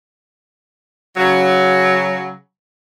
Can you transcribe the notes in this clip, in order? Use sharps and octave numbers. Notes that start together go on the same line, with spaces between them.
C#3 F#3